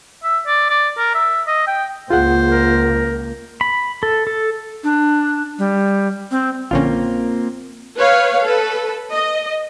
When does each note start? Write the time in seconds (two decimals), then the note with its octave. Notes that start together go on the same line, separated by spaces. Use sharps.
0.24 E5
0.47 D5
0.69 D5
0.98 A#4
1.14 E5
1.47 D#5
1.67 G5
2.10 C#2 A#3 F4 G#4 C5 F#5
2.49 A#4
3.61 B5
4.03 A4
4.27 A4
4.84 D4
5.58 G3
6.31 C4
6.71 A#1 D3 A#3 C4 C#4 F4
7.97 B4 C#5 F5
8.44 A4 B4
9.11 D#5